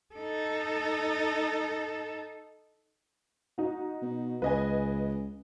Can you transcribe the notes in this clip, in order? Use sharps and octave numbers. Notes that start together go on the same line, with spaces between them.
D#4 A4
D#4 F#4
B2
C#2 B4 D#5 G#5